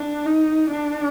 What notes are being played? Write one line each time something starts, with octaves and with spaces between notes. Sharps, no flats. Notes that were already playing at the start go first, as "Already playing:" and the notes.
Already playing: D4
D#4
D4